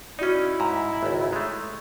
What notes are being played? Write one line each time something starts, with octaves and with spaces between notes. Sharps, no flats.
C#4 D#4 E4 F#4 D5
G#2 A#5
G#1 C#2
G#3 A3